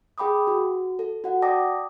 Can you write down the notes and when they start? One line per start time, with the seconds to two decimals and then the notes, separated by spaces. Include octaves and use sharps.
0.18 G#4 G5 B5 D6 D#6
0.47 F#4
0.99 A4
1.24 F#4 F#5
1.42 D5 G5 A5 D6 D#6 A#6